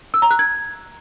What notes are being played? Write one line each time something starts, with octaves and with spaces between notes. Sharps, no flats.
E6
A#5
F#6
G#6